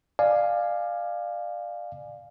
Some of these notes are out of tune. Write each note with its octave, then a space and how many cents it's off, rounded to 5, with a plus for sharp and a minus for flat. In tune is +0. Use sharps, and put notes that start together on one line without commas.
D5 +25 F5 +0 G#5 +10